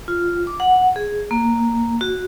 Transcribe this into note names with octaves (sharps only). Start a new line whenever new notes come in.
F4
D6
F#5
G#4
A#3
F#4